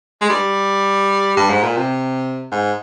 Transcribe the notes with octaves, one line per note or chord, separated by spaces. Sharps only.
G#3
G3
G2
G#2
A#2
C3
G#2